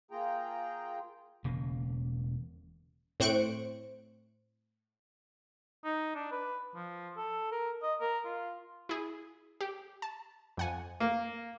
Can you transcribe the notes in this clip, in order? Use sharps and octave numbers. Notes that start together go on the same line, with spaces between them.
A#3 F4 G#4 G5 A#5
E1 C#3 A#3
A2 C4 C5 C#6 F#6 D7
D#4
D4
B4
F3
A4
A#4
D#5
A#4
F4
E4 G#4
G4
A5
F2 F#5 G#5
A#3